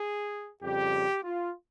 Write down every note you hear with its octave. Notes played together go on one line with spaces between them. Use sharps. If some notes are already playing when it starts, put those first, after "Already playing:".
Already playing: G#4
F2 C#3 G3 G4
F4